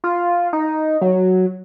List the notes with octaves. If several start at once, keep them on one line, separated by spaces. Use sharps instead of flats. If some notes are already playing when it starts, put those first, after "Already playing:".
F4
D#4
F#3